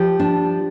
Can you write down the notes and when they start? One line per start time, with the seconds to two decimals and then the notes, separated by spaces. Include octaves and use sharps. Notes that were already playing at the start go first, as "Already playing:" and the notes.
Already playing: F3 G4
0.20 D4